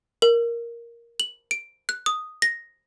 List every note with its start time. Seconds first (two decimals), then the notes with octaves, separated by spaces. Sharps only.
0.22 A#4
1.20 F#7
1.51 D7
1.89 F#6
2.06 D#6
2.42 A#6